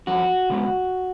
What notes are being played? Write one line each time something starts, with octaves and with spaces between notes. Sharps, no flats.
F2 F#4
C#3 G#3 B3